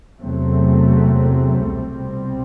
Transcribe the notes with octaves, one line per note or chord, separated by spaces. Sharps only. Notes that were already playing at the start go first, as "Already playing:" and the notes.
E2 C3 F#3 A3 C4
C2 B2 G3 C4